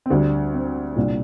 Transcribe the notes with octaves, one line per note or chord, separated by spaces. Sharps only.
C4
D2 D3 G3 D4
C4
C2 A#2 G3 D4